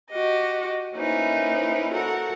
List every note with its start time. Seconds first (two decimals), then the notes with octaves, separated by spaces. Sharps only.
0.11 F#4 G4 D#5
0.95 A#3 C#4 D#4 E4 B4 C5
1.93 F#4 A4 A#4 F#5